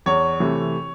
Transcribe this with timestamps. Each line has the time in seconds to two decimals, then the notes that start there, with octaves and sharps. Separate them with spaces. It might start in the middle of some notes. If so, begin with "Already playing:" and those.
0.06 E2 C#5
0.40 C3 E3 A3